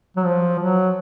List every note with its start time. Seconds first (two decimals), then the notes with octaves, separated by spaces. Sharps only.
0.17 F#3
0.25 F3
0.59 F#3